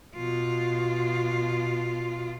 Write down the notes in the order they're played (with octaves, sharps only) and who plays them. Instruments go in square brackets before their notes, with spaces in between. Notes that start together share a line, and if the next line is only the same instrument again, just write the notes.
[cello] B2 F4